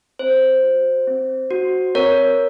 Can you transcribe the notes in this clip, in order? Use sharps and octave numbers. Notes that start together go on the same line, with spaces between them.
C4 C5
F#4
C4
F#4
C4 A#4 C#5